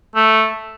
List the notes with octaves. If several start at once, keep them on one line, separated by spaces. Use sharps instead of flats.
A3